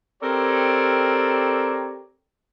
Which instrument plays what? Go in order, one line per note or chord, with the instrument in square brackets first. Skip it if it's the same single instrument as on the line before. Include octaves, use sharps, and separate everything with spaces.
[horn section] C4 G4 A4 A#4 C#5 D5